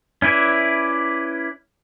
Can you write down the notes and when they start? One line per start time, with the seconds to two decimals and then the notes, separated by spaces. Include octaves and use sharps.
0.22 C#4 E4 B4 D5 E5